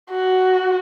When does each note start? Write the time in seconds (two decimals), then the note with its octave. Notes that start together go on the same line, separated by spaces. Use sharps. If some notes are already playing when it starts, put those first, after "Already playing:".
0.10 F#4